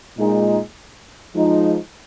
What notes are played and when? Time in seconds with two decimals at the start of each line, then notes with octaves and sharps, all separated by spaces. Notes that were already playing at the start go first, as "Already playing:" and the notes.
0.17 A#2 G#3 D#4
1.35 F3 G#3 D#4